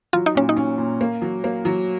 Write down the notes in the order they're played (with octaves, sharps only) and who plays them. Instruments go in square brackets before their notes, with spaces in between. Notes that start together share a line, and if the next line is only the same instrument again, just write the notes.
[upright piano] F#3 [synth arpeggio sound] F4
[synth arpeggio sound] D#4
[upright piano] A#2 [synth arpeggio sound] C#4
[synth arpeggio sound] D#4
[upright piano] C#4
A#2
A#3
F#3
A#3
F#3